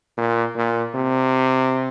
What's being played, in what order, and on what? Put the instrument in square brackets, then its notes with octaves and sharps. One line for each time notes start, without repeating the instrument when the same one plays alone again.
[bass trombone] A#2
A#2
C3